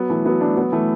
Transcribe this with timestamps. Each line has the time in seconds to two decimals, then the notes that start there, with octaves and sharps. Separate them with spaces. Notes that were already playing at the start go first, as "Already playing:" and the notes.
Already playing: F#3 B3
0.09 E3 A3
0.25 F#3 B3
0.41 A3 D4
0.57 F#3 B3
0.72 E3 A3